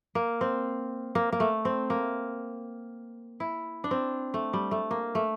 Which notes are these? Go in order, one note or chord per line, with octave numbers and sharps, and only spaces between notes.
A#3
C4
A#3
A#3
A3
C4
A#3
E4
D4
C4
A3
G3
A3
A#3
A3